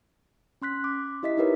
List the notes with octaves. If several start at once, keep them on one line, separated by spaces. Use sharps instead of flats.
C#4 C6 F#6 B6
D6
E4 G4 D#5 E5 B6
D#4 E4 G4 A#4 B4 C#5